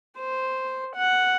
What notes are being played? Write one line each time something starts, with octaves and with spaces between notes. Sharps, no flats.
C5
F#5